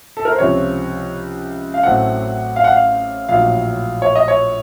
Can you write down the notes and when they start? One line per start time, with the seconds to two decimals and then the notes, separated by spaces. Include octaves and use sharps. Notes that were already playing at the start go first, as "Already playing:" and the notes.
0.17 A4
0.25 A#4
0.32 C5
0.38 C#2 C3 F3 C4 C#5
1.74 F5
1.83 A1 A2 F#3 A3 C4 F#5
2.56 F5
2.64 F#5
2.72 F5
3.29 A#1 A2 F#3 F5
4.02 C#5
4.15 D#5
4.28 C#5